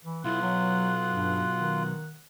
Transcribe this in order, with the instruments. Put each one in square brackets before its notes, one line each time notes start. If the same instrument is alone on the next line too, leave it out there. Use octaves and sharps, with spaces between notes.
[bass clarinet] E3
[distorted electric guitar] B1 [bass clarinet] E4 [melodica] F4 [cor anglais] F#5
[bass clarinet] F#3
G2
D#3